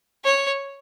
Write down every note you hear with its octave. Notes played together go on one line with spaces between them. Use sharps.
C#5